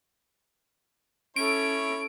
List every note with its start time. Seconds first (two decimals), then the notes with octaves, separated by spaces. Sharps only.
1.36 C#4 E4 A4 C#5 D7